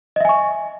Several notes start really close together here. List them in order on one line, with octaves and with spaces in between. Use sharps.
D#5 E5 G#5 C#6